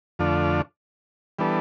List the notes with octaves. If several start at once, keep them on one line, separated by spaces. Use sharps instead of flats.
F2 D3 A3 D4 F4
E3 G3 B3 D4 A4